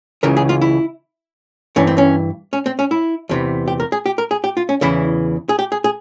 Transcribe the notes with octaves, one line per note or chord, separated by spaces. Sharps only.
C#2 C#3 E3 A#4
G#4
F4
E4
G2 E3 C#4
C4
C#4
C#4
C4
C#4
E4
E2 C3 E3
G4
A#4
G#4
G4
A#4
G#4
G4
F4
C#4
E2 C#3 E3 E4
G#4
G4
G#4
G#4